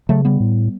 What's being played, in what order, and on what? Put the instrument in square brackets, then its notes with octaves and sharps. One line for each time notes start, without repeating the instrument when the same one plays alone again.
[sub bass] C#3 [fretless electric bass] F#3 A3
[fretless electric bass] G3 B3
[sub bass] A2